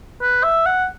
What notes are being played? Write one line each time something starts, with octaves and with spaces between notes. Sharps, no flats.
B4
E5
F#5